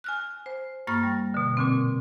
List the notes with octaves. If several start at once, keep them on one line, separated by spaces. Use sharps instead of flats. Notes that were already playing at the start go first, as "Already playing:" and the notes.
G#5 F6 F#6
C5
G2 A#3 C#6 F6 A6
G3
B2 D3
A#2 D3 C4